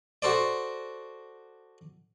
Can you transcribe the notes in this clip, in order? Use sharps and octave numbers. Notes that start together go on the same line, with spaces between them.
F#4 A4 C5 D5